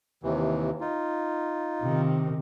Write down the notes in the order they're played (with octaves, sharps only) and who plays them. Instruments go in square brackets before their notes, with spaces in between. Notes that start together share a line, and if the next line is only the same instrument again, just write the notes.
[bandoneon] D#2 C3 E3
D#4 F4
[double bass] C3 D#3